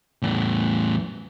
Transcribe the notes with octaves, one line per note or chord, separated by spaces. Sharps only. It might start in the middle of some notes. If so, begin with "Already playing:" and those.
E2 A2